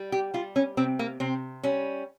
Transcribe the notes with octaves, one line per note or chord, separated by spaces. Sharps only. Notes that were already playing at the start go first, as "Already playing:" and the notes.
Already playing: G3
G4
G3 F4
C#4
C3 C4
A#3
C3 C4
G3 C#4